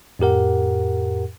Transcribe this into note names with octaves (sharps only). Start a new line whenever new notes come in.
F2 A2 G4 A#4 F#5